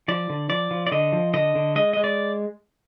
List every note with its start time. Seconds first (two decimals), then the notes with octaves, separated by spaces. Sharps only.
0.08 F3 D5
0.30 D3
0.50 F3 D5
0.71 F3
0.87 D5
0.92 D3 D#5
1.12 F3
1.34 D3 D#5
1.55 D3
1.76 G#3 D#5
1.93 G#3 D#5
2.04 D5